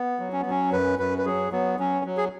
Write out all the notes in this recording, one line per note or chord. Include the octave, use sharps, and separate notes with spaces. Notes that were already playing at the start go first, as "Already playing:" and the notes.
Already playing: B3
F#3
C#4
B3
F#3 C#4
F#2 B4
F#2 B4
B4
F#3 G#4
F#3 B3
F#3 C#4
F#3
G#4